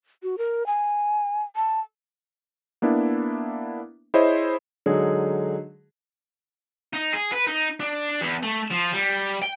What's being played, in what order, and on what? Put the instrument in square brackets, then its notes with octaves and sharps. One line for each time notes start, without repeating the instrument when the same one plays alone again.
[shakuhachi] F#4
A#4
G#5
A5
[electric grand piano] A#3 B3 D4 E4
E4 G#4 C5 C#5 D#5
[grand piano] D3 F#3 G#3 D#4 G#4
[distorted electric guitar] D#4
G#4
B4
D#4
D4
E2
A3
F3
G3
G5